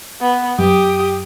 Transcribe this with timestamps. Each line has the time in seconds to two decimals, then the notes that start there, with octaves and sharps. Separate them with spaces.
0.21 B3
0.59 F#2 G4 D#6